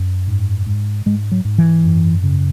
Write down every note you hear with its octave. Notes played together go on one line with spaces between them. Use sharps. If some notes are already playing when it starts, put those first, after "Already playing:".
Already playing: F#2
G#2
G#2
G#2 G#3
F#3
G#2
E3
F#2
C#3